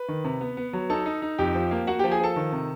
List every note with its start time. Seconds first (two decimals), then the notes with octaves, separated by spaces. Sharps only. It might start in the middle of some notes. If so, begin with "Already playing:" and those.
Already playing: B4
0.08 D#3
0.24 C3
0.41 B3
0.57 B3
0.73 F#3
0.90 D#4 A4 A5
1.06 D#4
1.22 D#4
1.38 F2 G4 G5
1.55 F3
1.71 A#3
1.87 A#3 F#4 F#5
1.99 F3 G4 G5
2.11 G#4 G#5
2.20 F3 A4 A5
2.36 D#3
2.52 C3